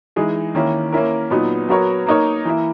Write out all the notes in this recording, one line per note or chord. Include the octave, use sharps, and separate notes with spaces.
E3 G#3 D#4 G#4
D#3 A#3 C#4 E4
A#3 C#4 E4 A#4
A#2 F#3 B3 D#4
F#3 B3 F#4 A#4 C#5
A#3 D#4 A#4 C#5
E3 A#3 E4